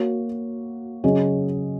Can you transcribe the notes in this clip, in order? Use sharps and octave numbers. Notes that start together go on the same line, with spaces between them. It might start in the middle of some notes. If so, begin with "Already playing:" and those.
Already playing: A#3 F#4 C#5
C#3 F#3 C#4 G#4 D#5